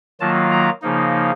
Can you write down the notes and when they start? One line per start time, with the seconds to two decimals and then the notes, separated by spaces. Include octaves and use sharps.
0.20 D#3 F#3 A#3 F4 A5
0.51 A#5
0.82 C#3 F3 A#3 D#4